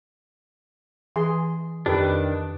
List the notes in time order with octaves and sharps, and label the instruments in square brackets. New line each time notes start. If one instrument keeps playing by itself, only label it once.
[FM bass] E3 [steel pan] G#4 C6
[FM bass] F2 [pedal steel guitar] D#3 D4 [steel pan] G4 B4